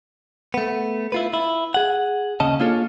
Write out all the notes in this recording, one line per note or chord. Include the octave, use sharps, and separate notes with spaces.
A3 B3
E4 F4 B4
E4
G#4 F#5
D#2 C#3 C#4 D#5 A5
A#3 D4 F4 G#4 A4 C#5